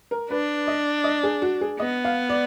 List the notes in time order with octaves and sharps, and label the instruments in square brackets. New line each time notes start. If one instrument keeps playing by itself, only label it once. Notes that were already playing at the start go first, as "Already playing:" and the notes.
[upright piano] A#4
[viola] D4 [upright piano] B4
[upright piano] D#5
D#5
G#4
F#4
G#4
[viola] B3 [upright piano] D#5
[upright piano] F5
D5